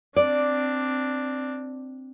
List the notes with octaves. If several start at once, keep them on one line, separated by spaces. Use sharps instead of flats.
C4 D4 D5